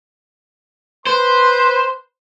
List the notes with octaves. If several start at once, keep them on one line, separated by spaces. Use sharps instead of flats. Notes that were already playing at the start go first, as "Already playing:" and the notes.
B4 C5 C6